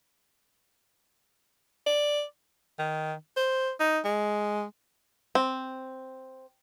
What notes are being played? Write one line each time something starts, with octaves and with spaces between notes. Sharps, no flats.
D5
D#3
C5
D#4
G#3
C4